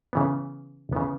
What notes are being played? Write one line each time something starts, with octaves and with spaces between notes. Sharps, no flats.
C#3 E3 B3
C#3 E3 B3